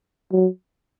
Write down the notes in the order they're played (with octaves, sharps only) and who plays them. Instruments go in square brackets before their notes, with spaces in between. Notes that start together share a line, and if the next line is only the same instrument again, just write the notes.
[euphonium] F#3